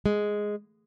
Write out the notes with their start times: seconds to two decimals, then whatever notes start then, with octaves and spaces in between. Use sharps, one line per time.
0.06 G#3